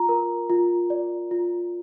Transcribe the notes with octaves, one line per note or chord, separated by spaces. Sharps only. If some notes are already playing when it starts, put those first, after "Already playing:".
Already playing: F4 A#5
A#4
F4
D5
F4